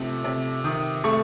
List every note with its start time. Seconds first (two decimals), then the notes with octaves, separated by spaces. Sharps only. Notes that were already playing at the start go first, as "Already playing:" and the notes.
Already playing: C3 F3 A3
0.24 C3
0.64 D#3 D#6
1.04 A3 C#6